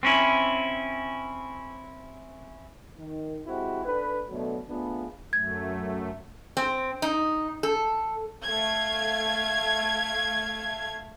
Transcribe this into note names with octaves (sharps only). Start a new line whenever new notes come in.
C4 C#4 E4
D#3
G#3 C4 E4 F#4 G4
D4 A4 B4
B2 D3 F#3 A3
A3 B3 D4 F4 G#4
F#2 A3 G#6
C4
D#4
A4
A3 F5 G#6